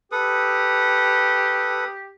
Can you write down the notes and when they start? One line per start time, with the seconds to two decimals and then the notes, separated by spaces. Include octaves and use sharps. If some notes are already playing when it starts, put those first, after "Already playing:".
0.12 G4 A4 B4 D#6